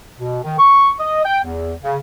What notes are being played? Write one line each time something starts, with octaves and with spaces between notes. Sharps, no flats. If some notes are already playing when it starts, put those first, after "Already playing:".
B2
D#3
C#6
D#5
G5
E2
C#3